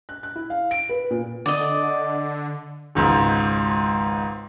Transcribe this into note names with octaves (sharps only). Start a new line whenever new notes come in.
F#6
F#6
E4
F5
D7
B4
A#2
D3 D5 D#5
G#1 C#2 G#2